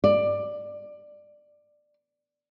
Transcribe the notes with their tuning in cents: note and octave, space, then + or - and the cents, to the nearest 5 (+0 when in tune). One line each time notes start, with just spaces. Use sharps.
D5 +15